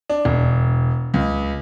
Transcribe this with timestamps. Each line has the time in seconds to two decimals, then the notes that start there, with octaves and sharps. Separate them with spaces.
0.09 D4
0.25 E1
1.14 C#2